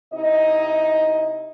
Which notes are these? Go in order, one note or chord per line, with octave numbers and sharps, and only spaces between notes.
C3 D#4 E4 D#5